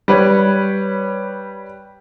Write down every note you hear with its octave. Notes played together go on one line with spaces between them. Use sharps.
G3 B4 C#5